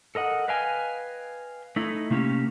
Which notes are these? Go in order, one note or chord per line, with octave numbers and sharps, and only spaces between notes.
A4 A#4 D#5 F#5
B4 D#5 F5 G5 G#5
A3 D#4 E4
C3 A3 A#3 C#4 G4